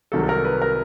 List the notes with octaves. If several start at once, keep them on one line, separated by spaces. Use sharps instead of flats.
C2 C3 D#3 F#3 A4
A4
A#4
B4
A#4